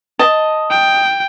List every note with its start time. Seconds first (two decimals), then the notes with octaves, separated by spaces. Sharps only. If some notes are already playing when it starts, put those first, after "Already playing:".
0.19 D#5 A5
0.71 G5